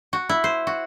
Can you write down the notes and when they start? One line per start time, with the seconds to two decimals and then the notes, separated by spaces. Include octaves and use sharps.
0.13 F#4
0.29 E4
0.44 C5
0.67 F#4